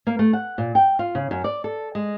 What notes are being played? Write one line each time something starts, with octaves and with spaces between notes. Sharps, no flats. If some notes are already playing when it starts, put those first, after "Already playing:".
A#3
A3
F#5
A#2
G5
F4
C#3
F#2
D5
A4
G#3